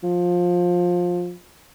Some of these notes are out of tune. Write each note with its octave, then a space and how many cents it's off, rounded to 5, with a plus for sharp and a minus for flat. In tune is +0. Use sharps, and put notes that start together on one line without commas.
F3 +20